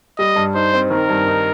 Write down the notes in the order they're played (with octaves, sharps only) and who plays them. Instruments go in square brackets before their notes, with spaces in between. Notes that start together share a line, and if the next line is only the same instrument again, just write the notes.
[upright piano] G3 [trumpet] D#5
[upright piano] G2
[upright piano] D#4 [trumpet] C5
[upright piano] C4
[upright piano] D#3 [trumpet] A#4
[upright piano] G2
D#4